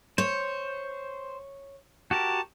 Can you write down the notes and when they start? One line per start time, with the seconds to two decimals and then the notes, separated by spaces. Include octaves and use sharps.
0.18 C5 C#5
2.11 F#4 G4 A#4 A5